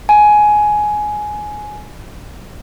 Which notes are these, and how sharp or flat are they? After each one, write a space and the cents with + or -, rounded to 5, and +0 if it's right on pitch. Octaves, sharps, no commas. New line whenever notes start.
G#5 +15